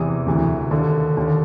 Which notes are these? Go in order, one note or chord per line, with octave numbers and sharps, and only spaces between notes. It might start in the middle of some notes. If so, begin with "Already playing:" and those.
Already playing: E2 C3 E3 D#6
D2 C3 E3
D#2 D3
D#2 D3